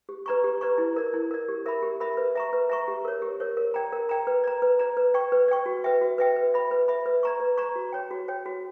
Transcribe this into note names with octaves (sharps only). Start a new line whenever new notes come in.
G4
B4 D5 A#5 C#6
G4
B4 D5 A#5 C#6
E4
A#4 D5
E4
A#4 D5
G4
A#4 E5 B5
G4
A#4 E5 B5
B4
E5 A#5 C#6
B4
E5 A#5 C#6
G4
A#4 C#5
G4
A#4 C#5
A#4
D5 G5 A#5
A#4
D5 G5 A#5
B4
D5 A#5
B4
D5 A#5
B4
D5 G5 C#6
B4
D5 G5 C#6
F#4
B4 E5 G5
F#4
B4 E5 G5
B4
E5 B5
B4
E5 B5
B4
D5 A#5 C#6
B4
D5 A#5 C#6
F#4
C#5 G5
F#4
C#5 G5
F#4